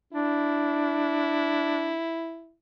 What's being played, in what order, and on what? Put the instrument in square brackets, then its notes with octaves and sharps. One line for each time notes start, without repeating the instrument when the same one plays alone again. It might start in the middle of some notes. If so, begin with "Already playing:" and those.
[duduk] D4 [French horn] E4